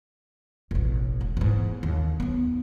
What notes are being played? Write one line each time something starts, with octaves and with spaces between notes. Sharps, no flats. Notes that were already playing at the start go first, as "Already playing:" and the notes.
E1 A1
G#3
E2 G#2
D#2
B3 D#4